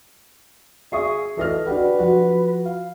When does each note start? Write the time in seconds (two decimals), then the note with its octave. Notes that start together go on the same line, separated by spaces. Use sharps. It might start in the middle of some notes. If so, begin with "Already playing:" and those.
0.92 G#4 E5 C#6 D#6
1.37 E3 A4 D#5 F6
1.66 D4 F#4 G4 B4
1.99 F3 F#4
2.66 F5